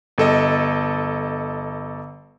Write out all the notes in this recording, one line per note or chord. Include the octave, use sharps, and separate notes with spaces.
G1 A4 D#5